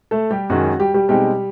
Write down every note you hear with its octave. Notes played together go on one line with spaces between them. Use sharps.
A3 A4
G3 G4
F#2 D#3 G#3 C#4 F#4
F#4
G3 G4
G3 G4
B2 G3 G#3 C4 D#4 G4